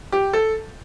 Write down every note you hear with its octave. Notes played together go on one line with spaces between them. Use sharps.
G4
A4